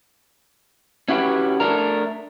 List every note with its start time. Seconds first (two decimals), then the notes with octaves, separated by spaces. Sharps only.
1.08 C#4 E4 F#4 G4 B4
1.60 A3 D4 A#4